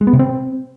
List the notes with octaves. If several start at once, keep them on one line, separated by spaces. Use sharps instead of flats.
G#3
B3
C3
C4